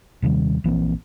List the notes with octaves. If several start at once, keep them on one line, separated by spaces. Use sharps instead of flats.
D#2 C3 D#3 G3
A#1 E3 A#3 C4